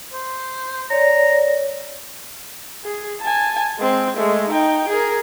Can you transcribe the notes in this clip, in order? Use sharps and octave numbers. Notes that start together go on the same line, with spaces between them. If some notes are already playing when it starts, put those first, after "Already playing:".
C5
C#5 D5 A#5
G#4
G#5 A5
G#3 C4
G#3 A3
D#4 G5
G#4 A#4